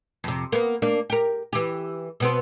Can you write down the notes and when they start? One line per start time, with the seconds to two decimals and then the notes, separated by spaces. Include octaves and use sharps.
0.24 F2 C3
0.52 A#3 B3
0.82 A#3 D4
1.10 G4 A#4
1.53 E3 G4
2.20 B2 B3 C4